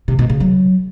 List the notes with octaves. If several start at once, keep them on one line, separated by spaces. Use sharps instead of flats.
C3
B2
C#3
F#3